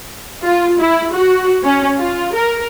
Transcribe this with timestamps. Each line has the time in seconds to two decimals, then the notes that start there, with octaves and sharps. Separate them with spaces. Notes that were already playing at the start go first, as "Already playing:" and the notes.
0.44 F4
0.80 E4
1.13 F#4
1.64 C#4
1.98 F4
2.34 A#4